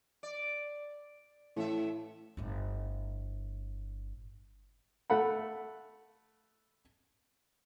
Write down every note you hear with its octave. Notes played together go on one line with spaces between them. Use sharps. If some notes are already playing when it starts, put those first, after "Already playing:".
D5
A2 E3 E5
G1 A2
A3 F#5 B5